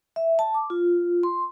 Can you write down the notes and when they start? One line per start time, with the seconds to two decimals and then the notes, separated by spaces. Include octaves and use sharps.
0.16 E5
0.39 A5
0.54 D6
0.70 F4
1.23 C6